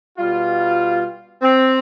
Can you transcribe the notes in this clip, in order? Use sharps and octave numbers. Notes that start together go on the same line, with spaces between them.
B2 G3 F4
C4